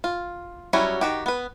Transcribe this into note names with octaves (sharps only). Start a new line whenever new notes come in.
F4
F#3 G3 C#4 E4 F#4
D#3 F#4 G4
B3 B4